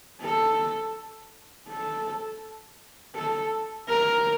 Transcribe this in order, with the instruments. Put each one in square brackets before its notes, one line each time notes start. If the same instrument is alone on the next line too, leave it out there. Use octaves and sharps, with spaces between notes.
[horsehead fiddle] A4
A4
A4
A#4